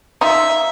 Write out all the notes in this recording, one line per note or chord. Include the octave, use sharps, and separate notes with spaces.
D#4 F4 E5